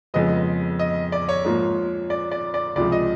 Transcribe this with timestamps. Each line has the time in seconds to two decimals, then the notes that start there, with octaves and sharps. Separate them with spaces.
0.14 F2 C#3 F3 G#3 B3 D#5
0.79 D#5
1.12 D5
1.29 C#5
1.45 G#2 F3 A#3
2.10 D5
2.31 D5
2.54 D5
2.75 C#2 C3 F3 G#3 D5
2.92 D#5